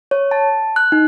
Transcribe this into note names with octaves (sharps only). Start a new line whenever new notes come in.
C#5
A5
F#6
D#4